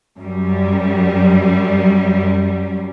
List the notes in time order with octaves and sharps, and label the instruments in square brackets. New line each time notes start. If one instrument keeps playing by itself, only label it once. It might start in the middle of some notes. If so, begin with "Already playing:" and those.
[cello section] F#2 G3